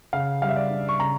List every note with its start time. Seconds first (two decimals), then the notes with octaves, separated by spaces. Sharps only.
0.13 C#3 F5
0.42 G3 F5
0.49 E5
0.56 D5
0.70 D4
0.89 C#6
1.00 C#3 A#5